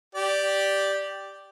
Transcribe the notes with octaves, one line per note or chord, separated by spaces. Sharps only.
G4 D5